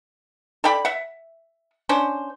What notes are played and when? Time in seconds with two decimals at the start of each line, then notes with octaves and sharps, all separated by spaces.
0.64 A4 D5 G5 B5
0.85 E5 F#5
1.89 C#4 D4 C5